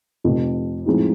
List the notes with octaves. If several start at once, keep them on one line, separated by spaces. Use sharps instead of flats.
F1 F2 C3
A2 F3 G#3 C4 D#4